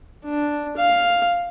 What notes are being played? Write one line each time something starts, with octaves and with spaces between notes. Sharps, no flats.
D4
F5